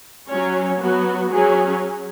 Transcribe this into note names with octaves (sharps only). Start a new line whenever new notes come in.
F#3 C#4 C#5
F#3 B3 F#4
F#3 C#4 G#4